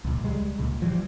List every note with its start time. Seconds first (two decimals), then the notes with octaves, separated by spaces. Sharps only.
0.04 C#2 A#2
0.23 C#2 G3 G#3
0.58 C#2 A#2
0.82 E3 F3 G3